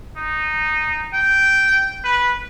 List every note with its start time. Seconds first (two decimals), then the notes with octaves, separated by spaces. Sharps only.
0.17 D#4
1.14 G5
2.04 B4